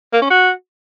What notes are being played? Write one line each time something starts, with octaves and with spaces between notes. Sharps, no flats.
A#3
C#4
F#4